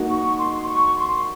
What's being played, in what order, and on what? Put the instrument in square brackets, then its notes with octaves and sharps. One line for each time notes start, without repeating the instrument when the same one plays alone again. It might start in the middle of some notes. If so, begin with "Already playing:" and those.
Already playing: [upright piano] A#3 D#4 F#4
[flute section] C#6
C6
C#6
C6